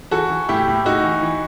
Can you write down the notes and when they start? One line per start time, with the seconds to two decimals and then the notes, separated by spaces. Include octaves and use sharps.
0.11 E3 F#4 A4
0.30 E3
0.49 A2 E4 G4
0.68 A2
0.85 A2 D#4 F#4
1.04 E3
1.23 E3